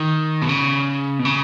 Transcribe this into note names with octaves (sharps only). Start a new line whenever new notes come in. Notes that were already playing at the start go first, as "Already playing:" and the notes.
Already playing: D#3
B2
C#3
B2
C#3